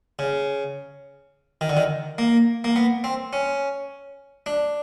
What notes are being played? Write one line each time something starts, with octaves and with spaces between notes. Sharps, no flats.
C#3
D#3
D3
D#3
A#3
A#3
B3
C4
C#4
D4